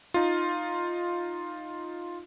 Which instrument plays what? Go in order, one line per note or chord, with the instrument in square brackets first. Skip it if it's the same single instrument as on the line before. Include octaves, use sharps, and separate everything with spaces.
[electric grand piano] D#4 F4